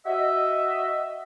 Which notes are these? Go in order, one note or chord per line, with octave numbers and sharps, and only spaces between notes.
F#4 D#5 E5